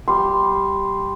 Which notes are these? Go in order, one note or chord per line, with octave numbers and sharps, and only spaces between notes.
G3 C6